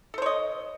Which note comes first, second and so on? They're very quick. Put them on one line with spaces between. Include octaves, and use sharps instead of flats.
A4 C5 C#5 D#5